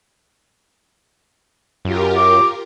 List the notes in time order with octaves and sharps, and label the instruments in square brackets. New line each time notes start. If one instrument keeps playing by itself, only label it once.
[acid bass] F#2 [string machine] F4 G4 A#4
[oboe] D6